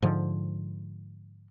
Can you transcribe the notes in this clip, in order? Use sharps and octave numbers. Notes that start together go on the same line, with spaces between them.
G#2 D3 F3